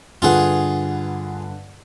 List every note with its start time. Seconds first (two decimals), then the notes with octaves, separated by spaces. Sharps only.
0.22 G2 D3 F4 G#4 B4 F#5